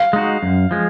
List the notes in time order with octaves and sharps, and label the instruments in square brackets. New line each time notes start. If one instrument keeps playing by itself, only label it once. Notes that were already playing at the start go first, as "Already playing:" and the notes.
Already playing: [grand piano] F5
[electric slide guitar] G#3 D#4 F#4
F#2
F3 G#3